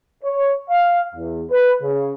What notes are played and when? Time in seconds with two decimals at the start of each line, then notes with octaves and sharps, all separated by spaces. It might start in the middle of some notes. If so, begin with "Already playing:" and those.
0.24 C#5
0.70 F5
1.15 E2
1.51 B4
1.82 C#3